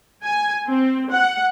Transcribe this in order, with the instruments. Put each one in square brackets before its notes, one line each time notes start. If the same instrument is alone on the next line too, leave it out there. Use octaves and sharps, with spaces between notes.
[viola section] G#5
C4
F#5